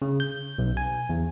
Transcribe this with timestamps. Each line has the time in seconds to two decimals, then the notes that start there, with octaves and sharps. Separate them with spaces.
0.02 C#3
0.20 G6
0.58 B1
0.77 G#5
1.09 E2